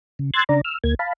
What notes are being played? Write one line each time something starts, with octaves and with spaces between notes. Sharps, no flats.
C#3
C6 E6 F#6 G#6 A6
C#3 D4 D5 A#5
E6 F6
D2 A#3 G#6
F5 A5 B5